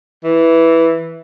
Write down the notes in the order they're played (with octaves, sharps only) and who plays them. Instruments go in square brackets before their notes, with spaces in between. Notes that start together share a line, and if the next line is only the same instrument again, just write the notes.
[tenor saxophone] E3